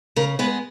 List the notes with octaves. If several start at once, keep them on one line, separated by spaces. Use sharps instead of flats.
C#3 A#4
G#3 B3 B4